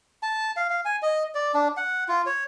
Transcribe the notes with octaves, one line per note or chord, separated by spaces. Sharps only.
A5
F5
F5
G#5
D#5
D5
D4
F#5
F4
C#5